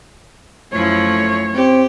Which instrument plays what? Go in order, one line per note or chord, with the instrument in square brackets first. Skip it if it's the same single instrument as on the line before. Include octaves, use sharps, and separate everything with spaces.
[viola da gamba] F#2 F3 E4 [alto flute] A3 [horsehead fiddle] C#5
[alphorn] C4 [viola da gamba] G4